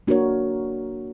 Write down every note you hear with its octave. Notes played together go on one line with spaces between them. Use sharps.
A#3 D4 F#4 A#4 C#5